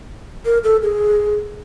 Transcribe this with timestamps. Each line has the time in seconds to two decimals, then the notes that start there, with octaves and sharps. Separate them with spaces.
0.45 A#4
0.64 A4
0.82 G#4